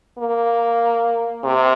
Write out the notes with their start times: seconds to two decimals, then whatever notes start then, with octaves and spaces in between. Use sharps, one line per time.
0.18 A#3
1.44 C3